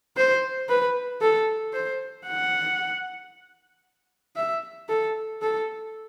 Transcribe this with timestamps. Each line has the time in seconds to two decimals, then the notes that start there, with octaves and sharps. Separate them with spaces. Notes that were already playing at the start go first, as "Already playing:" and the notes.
0.17 C5
0.69 B4
1.21 A4
1.73 C5
2.27 F#5
4.36 E5
4.89 A4
5.42 A4